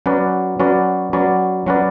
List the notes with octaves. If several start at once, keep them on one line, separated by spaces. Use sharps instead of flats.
F#3 C#4 F#4 B4 D5
F#3 C#4 F#4 B4 D5
F#3 C#4 F#4 B4 D5
F#3 C#4 F#4 B4 D5